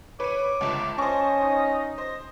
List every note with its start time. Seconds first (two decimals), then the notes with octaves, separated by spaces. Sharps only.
0.20 B4 C#5 D6 D#7
0.61 G1 C#2 A5
0.98 C#4 C5 D#5 C#6
1.42 D#4
1.98 C5 D#5